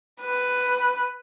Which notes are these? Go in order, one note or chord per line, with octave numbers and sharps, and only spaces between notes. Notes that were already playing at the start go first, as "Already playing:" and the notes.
B4